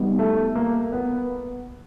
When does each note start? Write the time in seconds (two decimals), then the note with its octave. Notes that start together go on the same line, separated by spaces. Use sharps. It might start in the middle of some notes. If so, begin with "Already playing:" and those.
Already playing: G3 B3 D#4 G4
0.19 A3
0.55 A#3
0.92 B3